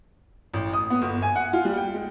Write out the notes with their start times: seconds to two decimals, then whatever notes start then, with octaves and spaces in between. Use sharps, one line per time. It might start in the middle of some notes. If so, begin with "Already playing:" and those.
0.53 A1
0.73 D#6
0.90 B3
1.02 G1
1.22 G#5
1.35 F#5
1.53 F4
1.65 G3
1.77 G5
1.94 G#3